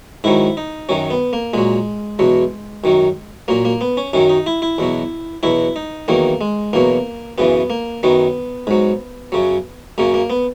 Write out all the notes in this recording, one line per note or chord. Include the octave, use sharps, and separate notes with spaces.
G#2 D#3 F#3 E4
D#4
F#2 D#3 F#3 C#4
B3
A#3
A#2 F#3 G#3
E2 B2 F#3
F#2 D#3 F#3
A#2 F#3 A#3
A#3
B3
C#4
F#2 D#3 F#3 C#4
D#4
E4
E4
E2 B2 F#3
E2 B2 F#3 E4
D#4
E2 D#3 F#3 A#3
G#3
E2 B2 F#3 A#3
F#2 C#3 E3 B3
A#3
F#2 D#3 F#3 B3
G#2 F#3
F#2 C#3 F#3
F#2 C#3 F#3 A#3
A#3
B3